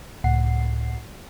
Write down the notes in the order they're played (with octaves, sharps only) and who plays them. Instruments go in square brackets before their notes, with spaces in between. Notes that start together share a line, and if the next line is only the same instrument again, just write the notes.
[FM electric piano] C#2 A2 F#5 C7